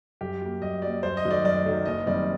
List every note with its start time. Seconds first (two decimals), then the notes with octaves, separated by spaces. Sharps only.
0.21 F#2 G4
0.42 F#3 A#3
0.62 F#2 D#5
0.82 F#3 A#3 D5
1.03 F#2 C5
1.17 D#5
1.24 D#3 F#3 A3
1.31 D5
1.44 F#2 D5
1.65 D#3 F#3 A3
1.86 F#1 D#5
2.06 F#2 D#3 G3 C4 D5